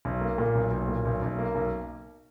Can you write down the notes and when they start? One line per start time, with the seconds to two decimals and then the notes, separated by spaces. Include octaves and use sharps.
0.05 B1
0.21 A#3
0.38 A#2
0.55 B1
0.71 B1
0.88 A#2
1.05 B1
1.22 B1
1.39 A#3
1.55 B1